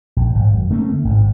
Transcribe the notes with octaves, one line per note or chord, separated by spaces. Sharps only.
A#1
G#1
F#2
A3 A#3 C4 C#4
D3 A3
G#1 A2